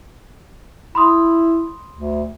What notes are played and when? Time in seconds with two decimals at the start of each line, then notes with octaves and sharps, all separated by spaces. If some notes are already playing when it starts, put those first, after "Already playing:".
0.95 E4 B5 C6 D#6
1.96 D2